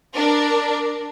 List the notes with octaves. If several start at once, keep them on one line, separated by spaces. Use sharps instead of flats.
D4 A#4